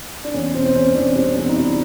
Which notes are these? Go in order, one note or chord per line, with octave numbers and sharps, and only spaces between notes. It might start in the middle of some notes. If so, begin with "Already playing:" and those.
D4
E2 C#4
B2 C4
C4
E2 C#4
E2 C4 D4
G3 C4 D4
E2 C4 D4
D#4
G3 D4 E4